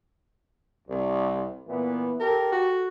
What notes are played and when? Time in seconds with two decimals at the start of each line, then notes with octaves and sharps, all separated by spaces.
0.88 C2
1.67 A#2 E3 B3
2.20 G4 A4 A#4
2.52 F#4